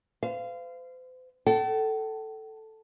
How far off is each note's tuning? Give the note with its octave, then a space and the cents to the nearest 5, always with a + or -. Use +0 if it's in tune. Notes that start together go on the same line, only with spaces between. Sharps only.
C5 -45 F5 -20
A4 +0 G5 -45